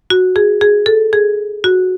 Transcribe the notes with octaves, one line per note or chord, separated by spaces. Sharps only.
F#4
G#4
G#4
A4
G#4
F#4